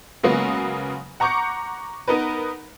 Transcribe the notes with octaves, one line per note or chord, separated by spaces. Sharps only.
C#3 F#3 G#3 A#3 B3
F#5 A#5 C#6 D6 G6 C#7
B3 D#4 A#4 B4